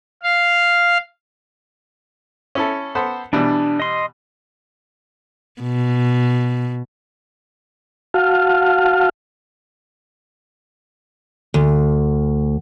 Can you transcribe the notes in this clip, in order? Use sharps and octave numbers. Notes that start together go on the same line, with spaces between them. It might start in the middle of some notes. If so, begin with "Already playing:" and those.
F5
C#4 E4 A4
B3 A4 C5
B2 E3 G3 D4
D#5 C6
B2
F#4 F5 F#5 A5 F6
D2